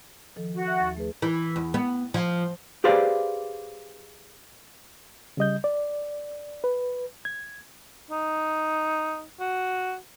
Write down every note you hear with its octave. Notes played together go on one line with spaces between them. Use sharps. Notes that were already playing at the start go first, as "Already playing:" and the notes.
D#3 F3 A4
F#4
E5
D#2 A6
A3 G#4 B4
E3
E2
B3
F3
G4 G#4 B4 C5 D5 F5
C#3 G3 D#5 G6
D5
B4
G#6
D#4
F#4